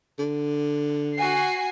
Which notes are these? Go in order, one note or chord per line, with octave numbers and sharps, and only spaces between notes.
D3
F#4 G#5 C7